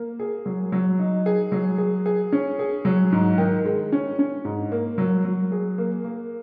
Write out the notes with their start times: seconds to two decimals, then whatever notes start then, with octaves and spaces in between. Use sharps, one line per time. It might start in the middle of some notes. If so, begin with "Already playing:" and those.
Already playing: A#3
0.19 G#4
0.46 F#3
0.72 F#3
0.99 D#4
1.26 G#4
1.52 F#3
1.78 G#4
2.06 G#4
2.32 C#4
2.59 G#4
2.85 F#3
3.12 G#2
3.38 D#3
3.65 G#3
3.92 C#4
4.19 C#4
4.45 G#2
4.72 A#3
4.98 F#3
5.25 F#3
5.52 G#4
5.78 A#3
6.04 A#3